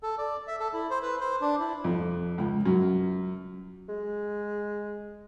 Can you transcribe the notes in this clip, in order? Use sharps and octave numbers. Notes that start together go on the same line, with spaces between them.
A4
D5
E5
A4
E4
C5
B4
C5
D4
E4
F2
C#2
F#2
G#3